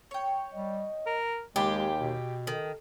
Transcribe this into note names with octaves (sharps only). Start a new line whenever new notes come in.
C#5 G5
G3 D#5
A#4
D#2 G#3 F4 G4 G#4 B5
B2
D#3 A4